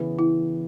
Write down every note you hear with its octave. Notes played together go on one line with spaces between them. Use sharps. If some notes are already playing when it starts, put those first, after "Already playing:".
Already playing: C#3 E3 B3
E4